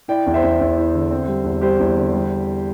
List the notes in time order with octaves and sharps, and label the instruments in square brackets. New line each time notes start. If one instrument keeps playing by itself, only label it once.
[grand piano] E4 D5 G5
E2
C5 E5
E2
E2
E4
D3
C4
G3
E2
G3 G4 C5
E2
D3
G3